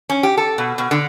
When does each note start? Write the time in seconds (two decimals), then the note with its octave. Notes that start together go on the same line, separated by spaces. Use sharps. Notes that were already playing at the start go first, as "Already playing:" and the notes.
0.10 C#4
0.23 G4
0.37 A4
0.58 B2
0.78 B2
0.91 D3